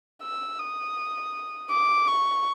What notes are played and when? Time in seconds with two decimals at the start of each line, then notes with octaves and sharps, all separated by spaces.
0.22 E6
0.60 D#6
1.70 D6
2.08 C#6